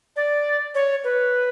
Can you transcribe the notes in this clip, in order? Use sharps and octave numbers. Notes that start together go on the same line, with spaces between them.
D5
C#5
B4